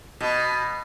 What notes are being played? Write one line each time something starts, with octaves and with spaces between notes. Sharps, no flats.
B2